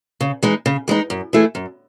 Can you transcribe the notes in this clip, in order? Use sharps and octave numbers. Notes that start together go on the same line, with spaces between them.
C#3
E3 G#3 D#4
C#3
E3 G#3 D#4
F#2
E3 A3 E4 G#4
F#2